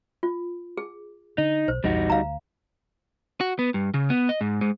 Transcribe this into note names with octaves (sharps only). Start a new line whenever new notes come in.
F4
G#4
D3 D#4
B1 C5
A#1 E2 G2 G3 D#4 F#4
D2 F5 A#5
F#4
B3
G2
C#3
B3
D#5
G#2
G#2